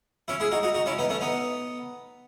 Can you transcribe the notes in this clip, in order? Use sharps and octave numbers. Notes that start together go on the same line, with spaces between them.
C#4 E4
E4 G#4
D#4 F#4
D#4 F#4
D#4 F#4
C#4 E4
B3 D#4
A3 C#4
B3 D#4